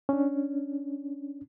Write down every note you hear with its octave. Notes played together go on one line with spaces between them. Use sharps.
C#4 D4